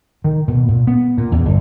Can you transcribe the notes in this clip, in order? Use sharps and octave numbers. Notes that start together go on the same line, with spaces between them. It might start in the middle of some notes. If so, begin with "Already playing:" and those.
D#3
B2
A#2
B3
A#2
E2
G1